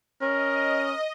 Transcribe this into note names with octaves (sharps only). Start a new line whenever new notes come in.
C#4 A#4 D#5